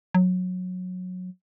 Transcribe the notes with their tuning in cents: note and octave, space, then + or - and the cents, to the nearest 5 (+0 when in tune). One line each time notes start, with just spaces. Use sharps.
F#3 -20